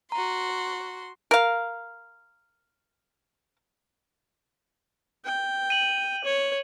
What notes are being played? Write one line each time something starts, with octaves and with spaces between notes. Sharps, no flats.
F#4 A#5 C6
A#4 F5
G5
D#7 F#7
C#5